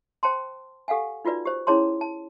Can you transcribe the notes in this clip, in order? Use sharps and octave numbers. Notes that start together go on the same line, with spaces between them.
C5 G5 A5 C6
G4 A4 F5 F#5 G#5
D#4 F4 F#4 B4 D5
G4 C5
C#4 E4 G#4 C#5 A5 C6
A5